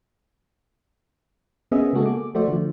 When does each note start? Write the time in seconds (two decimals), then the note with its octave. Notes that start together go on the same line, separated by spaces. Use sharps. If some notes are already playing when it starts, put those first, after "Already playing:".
1.72 A#3 B3 C#4 G#4 D#5 E5
1.93 C#3 G#3 A#3 F#4 G#4 A4
2.06 D6
2.34 F3 A3 F#4 C5 D5 E5
2.48 D3 F3